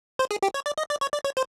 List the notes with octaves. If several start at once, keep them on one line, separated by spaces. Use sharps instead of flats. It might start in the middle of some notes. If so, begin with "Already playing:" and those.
C5
G#4
G4
C#5
D5
D#5
D5
C#5
D5
C#5
C5